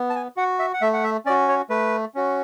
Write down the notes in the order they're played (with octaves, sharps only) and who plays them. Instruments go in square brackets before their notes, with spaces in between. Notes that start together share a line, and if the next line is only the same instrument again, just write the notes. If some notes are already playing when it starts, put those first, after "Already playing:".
Already playing: [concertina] B3
A5
G#5
F#4 F#5
E5
F#5
A3 E5
F#5
E5
C#4 D5
F#4
C#5
A3 B4
C#4 F#4